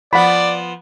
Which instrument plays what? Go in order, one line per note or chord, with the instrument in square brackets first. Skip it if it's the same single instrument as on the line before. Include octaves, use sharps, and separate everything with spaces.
[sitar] F3 B3 [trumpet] D5 [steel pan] F#5 B5